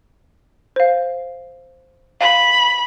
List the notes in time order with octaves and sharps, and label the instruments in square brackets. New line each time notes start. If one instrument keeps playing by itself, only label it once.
[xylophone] C5 F5
[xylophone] F5 [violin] B5